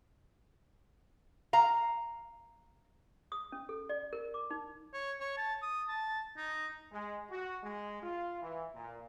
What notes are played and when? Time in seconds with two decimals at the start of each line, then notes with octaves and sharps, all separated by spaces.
1.53 F5 A#5
3.32 D#6
3.52 C#4
3.69 A4
3.89 D5
4.13 A#4
4.34 D6
4.51 D#4
4.93 C#5
5.20 C#5
5.37 A5
5.62 D#6
5.88 A5
6.37 D#4
6.93 G#3
7.31 F#4
7.64 G#3
8.03 F4
8.41 E3
8.75 A#2